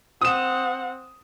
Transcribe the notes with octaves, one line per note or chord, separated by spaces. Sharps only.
C4 F#5 D#6 E7